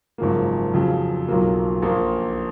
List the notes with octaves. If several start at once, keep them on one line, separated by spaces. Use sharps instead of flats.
G#1 F#2 C#3 F3 A#3
F2 C#3 F#3
B1 A#2 F#3 A#3
A#1 A#2 F3 A#3